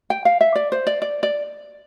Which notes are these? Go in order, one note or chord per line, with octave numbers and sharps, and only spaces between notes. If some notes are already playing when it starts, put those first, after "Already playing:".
G5
F5
E5
D5
C5
D5
D5
D5